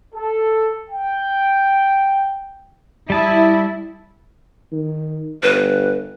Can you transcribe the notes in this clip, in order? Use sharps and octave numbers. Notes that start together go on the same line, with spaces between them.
A4
G5
G3 E4 A5 D#6
D#3
G1 B4